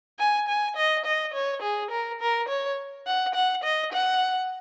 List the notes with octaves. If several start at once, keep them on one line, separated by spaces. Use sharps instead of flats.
G#5
G#5
D#5
D#5
C#5
G#4
A#4
A#4
C#5
F#5
F#5
D#5
F#5